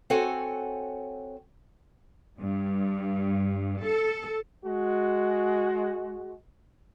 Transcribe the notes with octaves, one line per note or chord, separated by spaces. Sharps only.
C4 F#4 A4 C#5 F#5 G#5
G2
A4
G#3 F#4